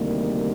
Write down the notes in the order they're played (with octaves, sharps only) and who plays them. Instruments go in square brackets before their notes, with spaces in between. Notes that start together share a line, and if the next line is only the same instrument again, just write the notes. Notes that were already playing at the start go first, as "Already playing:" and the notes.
Already playing: [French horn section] D2 C3 D#3 G3 A#3